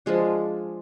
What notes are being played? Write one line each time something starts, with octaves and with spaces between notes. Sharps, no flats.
F3 G#3 D4